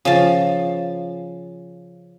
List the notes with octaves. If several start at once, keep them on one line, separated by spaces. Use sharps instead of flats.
C#3 F3 A5